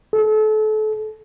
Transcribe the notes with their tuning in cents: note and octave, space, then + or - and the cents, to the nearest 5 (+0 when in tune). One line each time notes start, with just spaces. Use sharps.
A4 -30